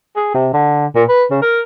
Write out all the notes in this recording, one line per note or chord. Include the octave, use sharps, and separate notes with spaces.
G#4
C3
D3
A#2
B4
C#3
A#4